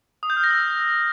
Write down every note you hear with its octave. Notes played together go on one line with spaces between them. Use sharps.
D#6
G6
F6
A#6
E6